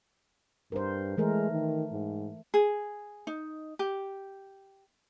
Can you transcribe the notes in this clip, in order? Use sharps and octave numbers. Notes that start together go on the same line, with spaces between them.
G2 A#4 C5
E3 G#3 A3 A#4
D#3
G#2
G#4
D#4
G4